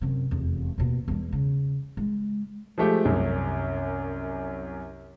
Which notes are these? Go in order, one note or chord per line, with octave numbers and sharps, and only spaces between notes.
F#2 C3
F1 E2
D#2 B2
E2 G#3
C#3
G#3
F3 G#3 A3 G4
C2 F#2